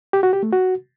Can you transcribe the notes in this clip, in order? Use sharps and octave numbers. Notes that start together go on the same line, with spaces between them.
G4
F#4
G4
A3
F#4